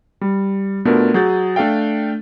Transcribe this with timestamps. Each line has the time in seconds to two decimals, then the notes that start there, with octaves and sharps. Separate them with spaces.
0.21 G3
0.85 B2 A3 D4 F4 A#4
1.14 F#3 G#4 G6 A6
1.56 A3 D4 A4 F5 G5